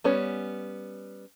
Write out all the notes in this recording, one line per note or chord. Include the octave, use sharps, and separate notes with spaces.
G3 B3 C#4 C#5